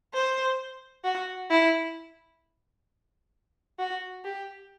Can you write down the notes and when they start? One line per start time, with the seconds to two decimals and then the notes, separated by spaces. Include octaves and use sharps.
0.14 C5
1.04 F#4
1.50 E4
3.79 F#4
4.25 G4